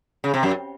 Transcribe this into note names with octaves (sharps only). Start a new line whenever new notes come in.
C#3
C3
F#2